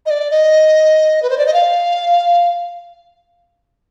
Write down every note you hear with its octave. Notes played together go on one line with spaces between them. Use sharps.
D#5
D5
D#5
B4
C5
D5
D#5
F5